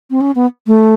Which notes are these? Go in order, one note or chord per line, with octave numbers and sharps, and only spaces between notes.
C4
C#4
B3
A3